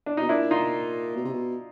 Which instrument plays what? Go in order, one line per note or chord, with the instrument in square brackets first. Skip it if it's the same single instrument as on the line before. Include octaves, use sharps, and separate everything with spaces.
[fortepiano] D4
[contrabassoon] B2 [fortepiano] D#4
[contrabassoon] A#2 [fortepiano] D4 E4
[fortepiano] D#4 F4
[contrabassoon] B2
C3
B2